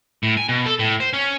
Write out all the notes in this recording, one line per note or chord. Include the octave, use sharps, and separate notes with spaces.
A2
G#5
B2
A4
A2
C5
C#4